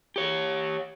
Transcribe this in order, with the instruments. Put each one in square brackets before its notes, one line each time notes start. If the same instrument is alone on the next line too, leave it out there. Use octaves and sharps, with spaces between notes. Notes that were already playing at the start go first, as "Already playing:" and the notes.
[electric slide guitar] G4 C#5